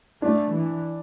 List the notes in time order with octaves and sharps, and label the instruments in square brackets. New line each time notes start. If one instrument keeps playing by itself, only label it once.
[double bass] A3 [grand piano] D4
[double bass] E3